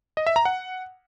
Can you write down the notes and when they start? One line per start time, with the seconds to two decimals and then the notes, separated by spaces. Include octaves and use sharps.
0.17 D#5
0.27 E5
0.36 A#5
0.45 F#5